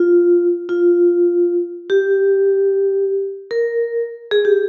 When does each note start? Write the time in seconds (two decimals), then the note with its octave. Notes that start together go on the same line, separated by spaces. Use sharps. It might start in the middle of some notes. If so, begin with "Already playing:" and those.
Already playing: F4
0.69 F4
1.90 G4
3.51 A#4
4.31 G#4
4.45 G4